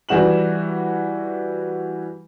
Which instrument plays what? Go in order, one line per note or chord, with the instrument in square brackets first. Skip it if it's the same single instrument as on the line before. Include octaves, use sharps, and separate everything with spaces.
[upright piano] E3 G3 F#4 E7 F#7